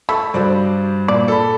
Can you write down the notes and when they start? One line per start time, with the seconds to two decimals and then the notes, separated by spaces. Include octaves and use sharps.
0.09 A3 A5 B5 C#6 E6
0.34 G2 F#4 C5 D5
1.08 A#2 D5
1.28 A4 B5